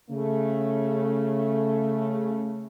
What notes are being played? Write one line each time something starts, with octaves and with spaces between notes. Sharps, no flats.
C#3 A3